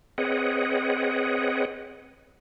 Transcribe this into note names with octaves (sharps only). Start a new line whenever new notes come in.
C4 G#4 B4 C#5 D#5 F#5